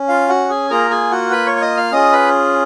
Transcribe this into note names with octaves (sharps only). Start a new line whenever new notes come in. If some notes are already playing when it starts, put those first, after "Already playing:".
Already playing: C#4
F4 F5
F#4 F#5
G#4 G#5
A#3 F4 G#4 A#4 A#5
G#4 G#5
F#4 F#5
B4 B5
C#5 C#6
C#6
D#5 D#6
F5 F6
C#4 F4 G#4 D#5 D#6
B4 B5